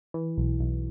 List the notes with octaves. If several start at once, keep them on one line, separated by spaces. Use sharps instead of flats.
E3
B1
B1